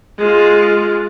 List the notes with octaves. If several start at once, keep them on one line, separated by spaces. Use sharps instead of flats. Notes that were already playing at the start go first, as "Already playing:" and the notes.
G#3 F4